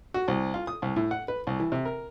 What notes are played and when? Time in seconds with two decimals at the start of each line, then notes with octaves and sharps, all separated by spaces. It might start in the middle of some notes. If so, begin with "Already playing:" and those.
0.14 F#4
0.28 C2
0.54 F4
0.67 D#6
0.82 C2
0.96 A2
1.11 F#5
1.28 B4
1.47 C2
1.60 E3
1.72 C3
1.85 A#4